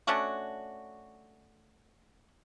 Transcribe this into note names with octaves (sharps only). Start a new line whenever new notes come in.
A3 C#4 D4 F#4